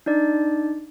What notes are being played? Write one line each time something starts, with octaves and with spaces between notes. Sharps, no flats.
D4 D#4 D5